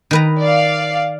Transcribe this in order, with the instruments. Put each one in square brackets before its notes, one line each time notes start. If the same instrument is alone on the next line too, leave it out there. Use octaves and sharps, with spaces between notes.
[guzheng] D#3 B4 A#5
[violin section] D5 F5